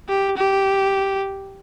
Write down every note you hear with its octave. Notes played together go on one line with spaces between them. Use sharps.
G4
G4